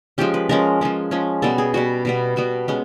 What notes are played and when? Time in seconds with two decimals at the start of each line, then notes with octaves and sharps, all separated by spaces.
0.18 F3 G#3 C#4 G4
0.34 B4
0.49 F3 G#3 C#4 A#4
0.81 F3 G#3 C#4
1.11 F3 G#3 C#4
1.42 B2 G3 B3 A4
1.58 G#4
1.74 B2 G3 B3 F#4
2.05 B2 G3 B3
2.36 B2 G3 B3 F#4
2.68 G#3 B3 C#4